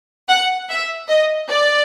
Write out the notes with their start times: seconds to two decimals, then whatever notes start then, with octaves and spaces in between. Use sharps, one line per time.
0.28 F#5
0.69 E5
1.08 D#5
1.49 D5